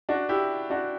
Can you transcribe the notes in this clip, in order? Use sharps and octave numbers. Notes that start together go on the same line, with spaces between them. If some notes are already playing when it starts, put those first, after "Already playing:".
D4 F#4
E4 G4
D4 F#4